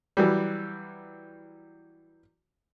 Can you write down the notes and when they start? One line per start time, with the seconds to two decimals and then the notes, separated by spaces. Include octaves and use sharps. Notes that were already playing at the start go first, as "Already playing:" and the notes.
0.17 E3 F#3 G3